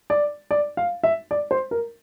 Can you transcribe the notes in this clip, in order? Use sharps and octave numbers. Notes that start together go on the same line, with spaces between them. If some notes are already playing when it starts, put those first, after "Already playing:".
D5
D5
F5
E5
D5
C5
A#4